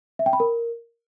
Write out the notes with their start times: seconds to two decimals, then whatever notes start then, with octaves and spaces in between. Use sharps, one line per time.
0.19 E5
0.26 G5
0.33 B5
0.40 A#4